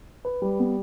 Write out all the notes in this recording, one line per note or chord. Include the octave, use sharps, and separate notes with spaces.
B4
G3
B3